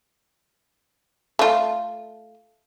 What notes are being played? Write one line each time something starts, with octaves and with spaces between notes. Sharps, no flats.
A3 F4